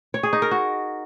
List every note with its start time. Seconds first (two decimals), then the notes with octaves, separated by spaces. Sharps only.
0.14 C#5
0.23 G#4
0.33 D#4
0.42 A#4
0.51 F#4